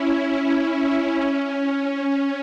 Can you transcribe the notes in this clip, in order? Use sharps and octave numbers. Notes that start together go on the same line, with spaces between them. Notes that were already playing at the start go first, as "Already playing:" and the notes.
Already playing: C#4 E4
C#4
C#4